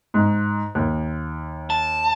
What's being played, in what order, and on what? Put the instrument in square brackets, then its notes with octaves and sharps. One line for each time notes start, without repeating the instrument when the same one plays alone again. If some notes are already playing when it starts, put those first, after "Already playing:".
[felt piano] G#2
D#2
[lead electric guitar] A5